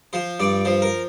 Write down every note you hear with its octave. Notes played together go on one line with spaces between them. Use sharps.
F3 C5
G2 D5
F3 C5
A#4